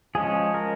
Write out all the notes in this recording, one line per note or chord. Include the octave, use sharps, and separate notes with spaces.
F3 G#3 C#4 G#4
A#4